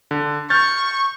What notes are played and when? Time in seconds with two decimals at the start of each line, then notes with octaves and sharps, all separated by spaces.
0.11 D3
0.50 C#6 F6 G6 A6